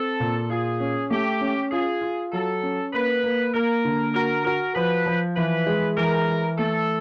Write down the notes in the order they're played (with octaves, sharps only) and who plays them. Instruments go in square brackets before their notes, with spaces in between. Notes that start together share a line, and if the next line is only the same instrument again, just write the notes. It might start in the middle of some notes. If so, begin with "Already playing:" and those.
Already playing: [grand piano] C4 [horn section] A4
[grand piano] A#2
[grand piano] F4 [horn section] G#4
[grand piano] C#4
[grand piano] A3 [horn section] G4
[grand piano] C#4
[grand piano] F4 [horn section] G#4
[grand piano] F4
[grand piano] F#3 [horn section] A4
[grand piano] C#4
[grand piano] A#3 [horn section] B4
[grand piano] A#3
[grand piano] A#3 [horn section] A#4
[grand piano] D3
[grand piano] F#4 [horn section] A#4
[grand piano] F#4 [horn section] A#4
[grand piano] F3 [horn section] B4
[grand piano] F3
[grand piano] E3 [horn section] B4
[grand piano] G#3
[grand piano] E3 [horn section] A#4
[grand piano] E3
[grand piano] A3 [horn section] A4